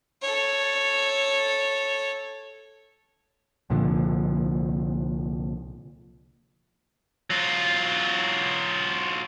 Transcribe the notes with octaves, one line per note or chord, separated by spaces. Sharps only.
A4 C#5
C2 A#2 D3 F3
F#3 F4